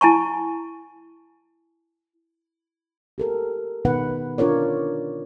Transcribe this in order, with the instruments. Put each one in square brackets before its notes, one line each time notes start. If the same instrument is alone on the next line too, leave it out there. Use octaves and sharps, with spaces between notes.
[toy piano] E4 G#5 A5 C#6
[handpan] G4 A4 A#4
B2 D#3 B3 D#4 B4 F#5
D4 F4 A#4 C#5 D5